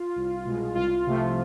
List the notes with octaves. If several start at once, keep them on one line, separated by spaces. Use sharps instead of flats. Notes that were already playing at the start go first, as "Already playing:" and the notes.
Already playing: F4
C2
B2 G#3
C2 F4
C3 F3 A3